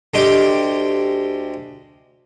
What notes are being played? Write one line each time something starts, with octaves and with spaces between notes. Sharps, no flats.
D2 G#3 G4 G5 D6